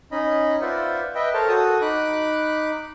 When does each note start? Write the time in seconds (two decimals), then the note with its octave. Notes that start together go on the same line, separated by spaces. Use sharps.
0.12 C#4 D#4 D#5 B5
0.61 F4 B4 C5 D5 E5 F#5
1.15 B4 D#5 E5 G5
1.34 A4 A#4 C5 C#5 A5
1.49 F#4 A4 D#6
1.82 D#4 B5 D6 F#6